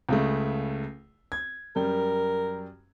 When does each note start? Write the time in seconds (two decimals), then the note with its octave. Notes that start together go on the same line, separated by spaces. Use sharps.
0.09 C#2 C#3 A3
1.32 G#6
1.76 F#2 G3 A#4